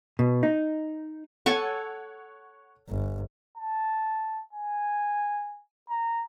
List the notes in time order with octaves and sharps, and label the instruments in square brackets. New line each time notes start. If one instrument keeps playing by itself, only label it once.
[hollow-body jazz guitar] B2
D#4
[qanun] A4 G#5 C#6 [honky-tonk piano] C#5 F#5
[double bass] G1
[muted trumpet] A5
G#5
A#5